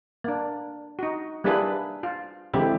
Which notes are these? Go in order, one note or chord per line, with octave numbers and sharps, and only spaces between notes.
A#3 D4
D#4 F#4
G3 A#3 D4 E4 G#4 B4
F4
D3 E3 G#3 C4 E4 G4